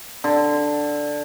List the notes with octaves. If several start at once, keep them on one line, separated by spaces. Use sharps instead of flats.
D3